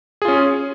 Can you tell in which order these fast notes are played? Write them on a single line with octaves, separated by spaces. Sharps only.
G#4 F4 C#4